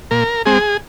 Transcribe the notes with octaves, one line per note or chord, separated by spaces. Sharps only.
A#2 A#4
G#3 C4 G#4